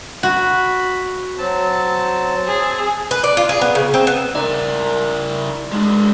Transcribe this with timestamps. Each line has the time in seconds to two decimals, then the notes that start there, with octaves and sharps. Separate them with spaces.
0.23 F#4 B5
1.38 F#3 C4 A5
2.48 G#4
3.11 B4
3.24 D5
3.37 F4
3.49 G#4
3.61 B3
3.75 C#3
3.94 C4
4.07 B3
4.35 E4 A#4 D5
5.72 G#3 D4